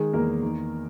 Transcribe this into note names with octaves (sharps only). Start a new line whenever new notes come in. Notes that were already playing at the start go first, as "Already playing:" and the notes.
Already playing: D#3 G#3 G#4
E2 A#3 A#4
D#3